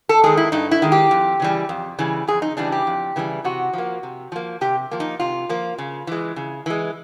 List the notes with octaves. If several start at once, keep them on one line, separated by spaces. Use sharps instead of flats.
A4
D#3 G#3 G#4
E4
G2 D#4
E4
D#3 G#3
G4
F2
C#3 E3 G3
F2
C#3 E3 G3
F2 G#4
D#4
C#3 E3 G3 D4
G4
F2
C#3 E3 G3
C3 F#4
F3 A#3
C3
F3 A#3
C3 G4
F3 A#3
D#4
C3 F4
F3 A#3
C#3
E3 G#3
C#3
E3 G#3